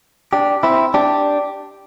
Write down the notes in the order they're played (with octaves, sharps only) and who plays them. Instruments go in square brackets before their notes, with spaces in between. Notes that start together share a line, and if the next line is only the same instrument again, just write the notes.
[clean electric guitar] D4 G4
C4 E4
D4 G4